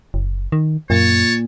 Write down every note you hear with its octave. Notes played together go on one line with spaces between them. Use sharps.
F#1
D#3
F#2 A#2 C#5 A5